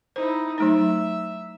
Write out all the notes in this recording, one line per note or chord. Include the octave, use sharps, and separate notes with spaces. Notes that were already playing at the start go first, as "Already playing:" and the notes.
D#4 E4 C5
F#3 A3 D#4 E5